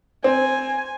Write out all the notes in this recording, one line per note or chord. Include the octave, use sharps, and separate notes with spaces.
C4 G#5